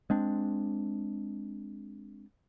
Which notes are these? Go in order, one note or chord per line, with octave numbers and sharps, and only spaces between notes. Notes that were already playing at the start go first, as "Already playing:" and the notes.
G#3 C4 D4